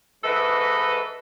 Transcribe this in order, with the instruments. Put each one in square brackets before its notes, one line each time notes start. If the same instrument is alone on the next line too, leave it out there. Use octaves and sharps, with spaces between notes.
[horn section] G#2 E3 A4 B4 D#5